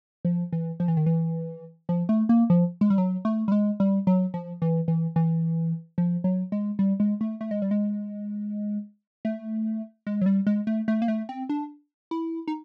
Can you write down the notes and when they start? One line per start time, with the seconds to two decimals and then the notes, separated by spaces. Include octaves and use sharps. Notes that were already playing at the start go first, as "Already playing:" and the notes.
0.25 F3
0.53 E3
0.80 F3
0.88 E3
0.97 D#3
1.06 E3
1.89 F3
2.09 A3
2.29 A#3
2.50 F3
2.81 G#3
2.90 G3
2.98 F#3
3.25 A3
3.48 G3
3.52 G#3
3.80 G3
4.07 F#3
4.34 F3
4.62 E3
4.88 E3
5.16 E3
5.98 F3
6.24 F#3
6.52 G#3
6.79 G3
7.00 G#3
7.21 A3
7.41 A3
7.51 G#3
7.62 G3
7.71 G#3
9.25 A3
10.07 G#3
10.21 F#3
10.26 G3
10.47 G#3
10.67 A3
10.88 A3
11.02 A#3
11.08 A3
11.29 C4
11.49 D4
12.11 E4
12.48 D#4